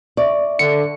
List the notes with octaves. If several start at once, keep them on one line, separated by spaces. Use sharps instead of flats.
D5 E5 C#6
D3 C#7